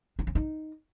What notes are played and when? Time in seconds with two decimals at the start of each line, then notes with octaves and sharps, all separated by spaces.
0.19 D4
0.27 C#4
0.35 D#4